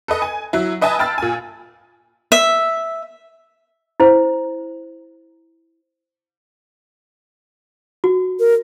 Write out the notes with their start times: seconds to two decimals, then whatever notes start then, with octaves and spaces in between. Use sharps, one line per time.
0.08 A4 B4 D#5
0.22 G#5
0.53 F#3 E4
0.81 B4 D#5 E5 G#5 A5
0.99 G5 A5 B5 E6 F6 A6
1.18 A#2 G#5
2.32 E5
4.00 E4 C5
8.04 F#4
8.39 A#4